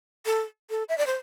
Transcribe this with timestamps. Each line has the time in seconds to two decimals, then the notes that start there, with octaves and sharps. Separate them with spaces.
0.26 A4
0.70 A4
0.89 E5
0.98 D5
1.07 C5